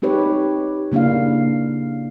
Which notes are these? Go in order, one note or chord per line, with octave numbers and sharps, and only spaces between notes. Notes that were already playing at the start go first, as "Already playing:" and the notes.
C4 D#4 G4 B4 C#5
C#3 A#3 D4 E4 F5